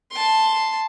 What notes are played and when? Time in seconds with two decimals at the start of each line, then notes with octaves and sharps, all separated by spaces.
0.11 A5 C6